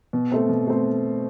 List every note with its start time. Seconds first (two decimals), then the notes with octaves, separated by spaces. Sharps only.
0.13 B2
0.32 A3 C4
0.49 B2
0.67 A3 C4